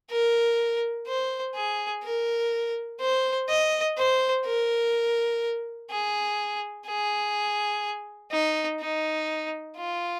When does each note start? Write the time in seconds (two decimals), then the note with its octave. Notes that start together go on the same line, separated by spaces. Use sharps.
0.11 A#4
1.07 C5
1.55 G#4
2.04 A#4
3.01 C5
3.49 D#5
3.97 C5
4.46 A#4
5.91 G#4
6.87 G#4
8.32 D#4
8.81 D#4
9.77 F4